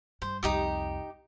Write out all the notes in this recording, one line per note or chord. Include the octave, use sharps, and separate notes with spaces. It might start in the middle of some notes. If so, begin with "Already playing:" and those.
G2 C5
C2 F2 D#4 G4 D#6